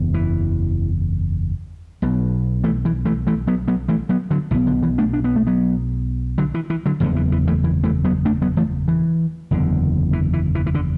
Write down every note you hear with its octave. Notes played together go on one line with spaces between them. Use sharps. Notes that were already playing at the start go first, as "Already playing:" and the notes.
Already playing: F#1 E2
E3
B1 B2
E3 A3
E3
E3 A3
E3 A3
F#3 B3
F#3 B3
E3 A3
F#3 B3
D3 F#3
B1 B2 E3
D3
E3
A3 D4
D4
B3
A3
F#3 B3
D3 F#3
E3
E3
D3 F#3
F#1 E2 D3 E3 A3
E3
E3
E3 A3
E3
E3 A3
F#3 B3
A3 D4
F#3 B3
E3 A3
E3
F#1 E2 D3
E3
E3
E3
E3
D3